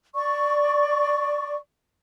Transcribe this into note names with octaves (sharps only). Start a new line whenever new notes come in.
D5 C#6